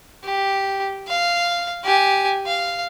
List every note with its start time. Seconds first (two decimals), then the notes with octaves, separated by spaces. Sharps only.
0.24 G4
1.08 F5
1.84 G4 G#5
2.46 F5